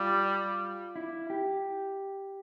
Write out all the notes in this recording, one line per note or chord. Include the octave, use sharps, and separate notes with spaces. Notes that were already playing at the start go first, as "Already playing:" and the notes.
Already playing: G3 F4
E4
G4